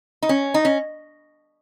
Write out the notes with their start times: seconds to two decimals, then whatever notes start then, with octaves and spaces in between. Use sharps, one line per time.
0.22 D#4
0.29 C#4
0.54 D#4
0.65 C#4